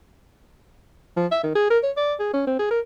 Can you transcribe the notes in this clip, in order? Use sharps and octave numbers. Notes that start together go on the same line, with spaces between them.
F3
E5
D#3
G#4
A#4
C#5
D5
G#4
C#4
C4
G#4
A#4